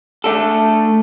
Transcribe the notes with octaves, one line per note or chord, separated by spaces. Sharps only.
A3 D4 A4